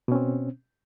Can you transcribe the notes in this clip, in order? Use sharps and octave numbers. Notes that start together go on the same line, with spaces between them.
B2 C4 C#4